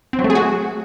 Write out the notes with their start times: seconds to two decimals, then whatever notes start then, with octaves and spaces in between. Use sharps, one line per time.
0.13 C4
0.19 F#3
0.24 A3
0.30 G#4
0.35 F#4